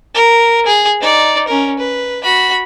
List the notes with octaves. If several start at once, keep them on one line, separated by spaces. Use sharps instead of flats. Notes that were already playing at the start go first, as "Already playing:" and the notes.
A#4
G#4
D#4 D5
C#4 A#4
B4
F#4 B5